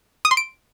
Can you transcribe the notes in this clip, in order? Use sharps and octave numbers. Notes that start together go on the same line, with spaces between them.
D#6
C6
D7